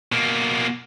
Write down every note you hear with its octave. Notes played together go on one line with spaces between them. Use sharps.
B2 A#3